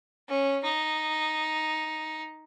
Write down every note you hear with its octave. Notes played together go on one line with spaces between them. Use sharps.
C#4
D#4